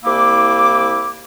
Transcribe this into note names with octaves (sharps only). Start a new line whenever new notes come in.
C2 A#3 E4 D6